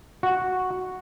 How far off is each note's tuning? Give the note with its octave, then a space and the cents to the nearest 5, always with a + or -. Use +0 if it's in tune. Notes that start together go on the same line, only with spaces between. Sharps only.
F#4 -5